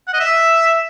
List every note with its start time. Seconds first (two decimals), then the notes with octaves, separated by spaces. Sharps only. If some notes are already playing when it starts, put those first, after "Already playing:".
0.08 F#5
0.14 D#5
0.20 E5